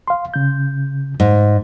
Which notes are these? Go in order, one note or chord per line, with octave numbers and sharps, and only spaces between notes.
F5 C6
C#3 G6
G#2